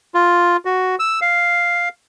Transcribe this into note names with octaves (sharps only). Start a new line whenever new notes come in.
F4
F#4
E6
F5